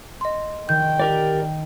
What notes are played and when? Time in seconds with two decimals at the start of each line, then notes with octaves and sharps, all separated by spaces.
0.21 D#5 C6
0.69 D#3 G5 G6
1.00 G4 A#4 D5